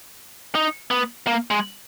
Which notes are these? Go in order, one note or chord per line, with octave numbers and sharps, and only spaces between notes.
D#4
B3
A#3
G#3